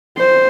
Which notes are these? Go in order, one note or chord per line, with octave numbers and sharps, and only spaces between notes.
C5